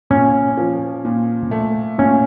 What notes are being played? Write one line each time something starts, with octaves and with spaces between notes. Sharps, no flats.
A#2 C#4
F3
A#2
A3
A#2 C#4